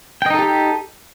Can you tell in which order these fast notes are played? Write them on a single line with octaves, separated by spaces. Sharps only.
G5 D#5 D#4 A4 G4